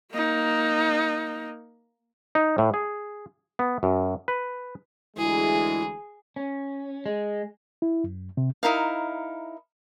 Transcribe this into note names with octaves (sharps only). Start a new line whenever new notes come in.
A#3 D#4
D#4
A2
G#4
B3
F#2
B4
D2 E3 G#3 E4 G#4
C#4
G#3
E4
F#2
C3
D#4 E4 A#4 F5